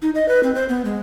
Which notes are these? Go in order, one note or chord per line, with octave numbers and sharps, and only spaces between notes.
D#4
D#5
B4
C4
C5
B3
G#3